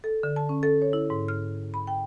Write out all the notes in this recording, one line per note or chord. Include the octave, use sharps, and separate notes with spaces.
A4
D3
A5
C#4
A4
C#5
E4
G#2
F6
B5
G5